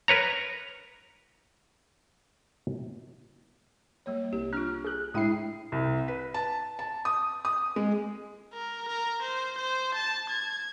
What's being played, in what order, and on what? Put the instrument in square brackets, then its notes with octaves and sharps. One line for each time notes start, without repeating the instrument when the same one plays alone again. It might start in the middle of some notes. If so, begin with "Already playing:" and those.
[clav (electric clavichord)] A#4 B4 C#5 A#5
[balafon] G3 A#3 C#5
[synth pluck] C2 [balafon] G4
[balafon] D4 F4 [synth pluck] F6
[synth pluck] G#4 F#6
[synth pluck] A2 E4 C7 [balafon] G#3 D4 G5
[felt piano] C2
B4
A5
A5
D#6
D#6
G#3
[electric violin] A#4
A#4
C5
C5
A5
G#6